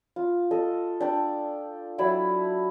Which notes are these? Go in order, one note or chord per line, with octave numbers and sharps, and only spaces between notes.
F4
A4 D#5
D4 G5 D6
F#3 E4 D5 E6